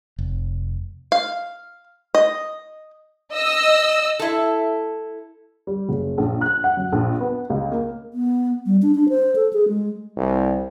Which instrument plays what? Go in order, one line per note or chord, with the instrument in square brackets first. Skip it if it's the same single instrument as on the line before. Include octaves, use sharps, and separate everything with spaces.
[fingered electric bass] F1
[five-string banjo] F5
D#5
[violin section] D#5 E6
[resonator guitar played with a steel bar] E4 A4
[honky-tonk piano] G3
F#1
A#1
F#6
F#5
F#2
A#1
B3
C#2
A#3
[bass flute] B3
G3
D4
D4
C5
A4
G#4
G#3
[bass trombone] C2